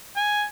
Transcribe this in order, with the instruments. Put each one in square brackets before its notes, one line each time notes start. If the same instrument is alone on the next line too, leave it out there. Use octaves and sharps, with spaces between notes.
[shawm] G#5